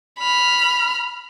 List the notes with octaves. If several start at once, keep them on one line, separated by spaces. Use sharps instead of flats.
B5 F6